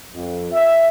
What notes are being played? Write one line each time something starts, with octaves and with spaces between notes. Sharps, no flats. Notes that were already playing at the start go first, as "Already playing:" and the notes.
F2
E5